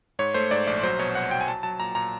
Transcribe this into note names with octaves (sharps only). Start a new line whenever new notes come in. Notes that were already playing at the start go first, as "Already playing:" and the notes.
G#2 C#5
A3 C5
G#2 D5
A#1 D5
F#3 C5
B2 C#5
C2 F#5
B2 G5
G#5
F#3 A5
F#3 A5
A#2 A#5
A#2 A#5